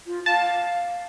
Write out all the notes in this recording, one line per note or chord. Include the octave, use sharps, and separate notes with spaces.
F4
F5 A5